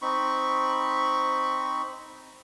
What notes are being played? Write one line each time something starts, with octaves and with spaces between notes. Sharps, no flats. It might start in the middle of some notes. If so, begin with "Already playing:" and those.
C4 D#4 B5 C#6